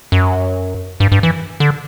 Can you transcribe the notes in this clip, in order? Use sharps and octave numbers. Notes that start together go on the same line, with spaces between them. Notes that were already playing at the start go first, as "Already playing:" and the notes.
F#2
G2
G2
E3
D3